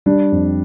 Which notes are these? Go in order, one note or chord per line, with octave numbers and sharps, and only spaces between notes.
G3 D4
F2